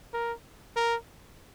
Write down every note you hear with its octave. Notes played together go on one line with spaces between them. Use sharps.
A#4
A#4